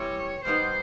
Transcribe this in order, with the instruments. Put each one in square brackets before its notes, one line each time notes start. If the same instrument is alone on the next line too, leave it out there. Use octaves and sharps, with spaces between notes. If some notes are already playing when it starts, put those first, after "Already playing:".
Already playing: [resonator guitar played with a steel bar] E3 G3 C4 E4 G4 [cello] C#5
[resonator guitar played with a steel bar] B2 G3 B3 D#4 [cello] C5